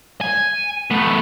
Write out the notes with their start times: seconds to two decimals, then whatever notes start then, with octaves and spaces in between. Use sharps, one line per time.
0.21 G#5
0.90 A3 B3